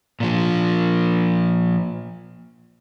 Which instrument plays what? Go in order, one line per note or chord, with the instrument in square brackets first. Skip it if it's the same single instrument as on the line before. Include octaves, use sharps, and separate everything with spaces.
[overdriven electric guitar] A#2 F3